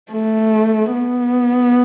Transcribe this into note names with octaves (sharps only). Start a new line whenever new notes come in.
A3
B3